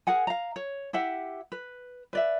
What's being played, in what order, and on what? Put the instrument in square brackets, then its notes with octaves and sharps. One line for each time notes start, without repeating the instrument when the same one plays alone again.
[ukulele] G#4 A#4 F#5 G#5
F5 A#5
C#5
E4 G4 E5 F#5
B4
B4 D5 E5